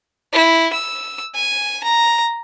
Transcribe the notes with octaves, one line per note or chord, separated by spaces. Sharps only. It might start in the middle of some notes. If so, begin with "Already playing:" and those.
E4
E6
G#5
A#5